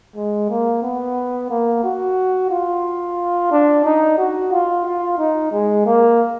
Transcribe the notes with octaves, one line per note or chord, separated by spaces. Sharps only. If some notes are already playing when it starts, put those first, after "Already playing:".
G#3
A#3
B3
A#3
F#4
F4
D4
D#4
F#4
F4
F4
D#4
G#3
A#3